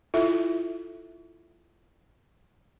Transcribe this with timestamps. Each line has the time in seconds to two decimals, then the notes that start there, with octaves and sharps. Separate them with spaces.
0.14 E4 F4 A4 E5